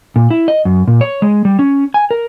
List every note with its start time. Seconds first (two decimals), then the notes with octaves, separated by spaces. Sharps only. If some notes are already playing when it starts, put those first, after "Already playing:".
0.16 A#2
0.31 E4
0.48 D#5
0.65 F#2
0.87 A#2
1.01 C#5
1.22 G#3
1.45 G3
1.59 C#4
1.94 G#5
2.11 A#4